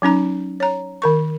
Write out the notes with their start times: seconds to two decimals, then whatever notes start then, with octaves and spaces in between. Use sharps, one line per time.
0.02 F#3 C#4 D#4 A#5
0.60 C#5 A#5
1.02 D#3 A#4 C#6